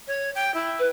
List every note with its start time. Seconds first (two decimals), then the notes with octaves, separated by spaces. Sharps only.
0.08 C#5
0.35 G5
0.54 E4
0.79 B4